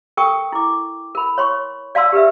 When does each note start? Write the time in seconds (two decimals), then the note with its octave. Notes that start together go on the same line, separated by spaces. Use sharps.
0.17 A4 A#4 G5 C#6 D#6
0.52 E4 D6
1.15 A#4 B5
1.38 C#5 C6 C#6
1.95 D5 F5 A5 C6 E6
2.12 G4 A#4 B4 E5